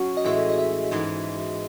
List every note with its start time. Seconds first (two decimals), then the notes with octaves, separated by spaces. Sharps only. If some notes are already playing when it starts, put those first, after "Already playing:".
Already playing: F#3 C#4 F#4
0.17 D#5
0.25 A2 E3 G#3 E5
0.50 D#5
0.58 E5
0.91 G#2 E3 G#3